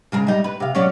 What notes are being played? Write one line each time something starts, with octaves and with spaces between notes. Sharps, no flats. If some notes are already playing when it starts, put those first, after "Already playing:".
C#3 G#3 A#4
G3 D#4
B4
C3 F5
F#3 C#4 D5